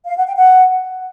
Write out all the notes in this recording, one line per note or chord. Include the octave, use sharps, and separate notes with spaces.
F5
F#5
G5
F#5